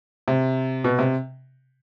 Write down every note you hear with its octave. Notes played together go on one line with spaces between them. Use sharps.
C3
B2
C3